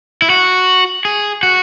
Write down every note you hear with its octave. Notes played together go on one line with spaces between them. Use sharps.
E4
F#4
G#4
F#4